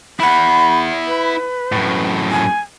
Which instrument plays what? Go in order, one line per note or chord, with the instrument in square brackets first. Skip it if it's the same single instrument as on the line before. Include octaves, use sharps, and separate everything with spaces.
[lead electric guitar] E4 F#5 [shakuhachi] B5
[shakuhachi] B4
[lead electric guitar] F#2 A2
[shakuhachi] G#5